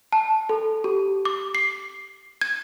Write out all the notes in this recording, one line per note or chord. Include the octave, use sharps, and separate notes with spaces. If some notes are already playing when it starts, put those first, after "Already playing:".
A5
A4
G4
D6
C7
G#6